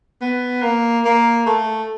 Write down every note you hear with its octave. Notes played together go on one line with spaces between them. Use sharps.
B3
A#3
A#3
A3